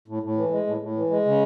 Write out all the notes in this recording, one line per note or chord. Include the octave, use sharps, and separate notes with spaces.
A2
A2
E3
G#3
A2
A2
E3
G#3
C#3